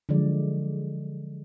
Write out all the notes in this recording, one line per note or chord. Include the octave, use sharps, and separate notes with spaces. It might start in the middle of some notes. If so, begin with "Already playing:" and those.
D3 F3 F#3 G#3 D5